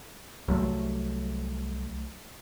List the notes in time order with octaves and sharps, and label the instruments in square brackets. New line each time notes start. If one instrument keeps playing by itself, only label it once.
[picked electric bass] C2 F#3 A3